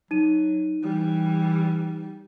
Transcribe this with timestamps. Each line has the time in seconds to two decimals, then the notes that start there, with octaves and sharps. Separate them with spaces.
0.11 F#3 D#4 D#7
0.83 E3 G3